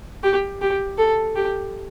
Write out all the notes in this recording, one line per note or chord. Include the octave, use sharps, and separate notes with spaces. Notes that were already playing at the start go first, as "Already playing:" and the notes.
G4
G4
A4
G4